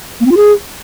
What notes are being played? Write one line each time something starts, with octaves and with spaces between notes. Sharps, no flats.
A#3
C4
F4
G#4